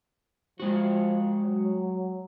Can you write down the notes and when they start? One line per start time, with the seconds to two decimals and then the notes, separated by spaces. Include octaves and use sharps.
0.60 F3 G#3 F#4
1.43 F#3